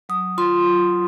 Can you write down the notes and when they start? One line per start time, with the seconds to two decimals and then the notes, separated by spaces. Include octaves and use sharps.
0.09 F#3 D#6
0.38 F4 C6
0.66 F#3